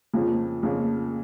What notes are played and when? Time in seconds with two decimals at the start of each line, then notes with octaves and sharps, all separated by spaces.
0.14 F2 C#3 F3 A#3 C#4
0.63 F2 C#3 F3 A#3 C#4